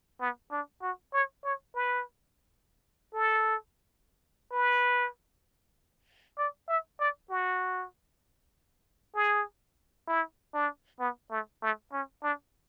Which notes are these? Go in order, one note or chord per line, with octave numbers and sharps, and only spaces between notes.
B3
D4
F#4
C#5
C#5
B4
A4
B4
D5
E5
D5
F#4
G#4
E4
D4
B3
A3
A3
C#4
D4